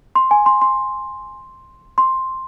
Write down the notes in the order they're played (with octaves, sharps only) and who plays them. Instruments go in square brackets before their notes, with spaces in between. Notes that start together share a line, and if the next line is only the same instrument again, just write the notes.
[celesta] C6
G#5
C6
C6
C6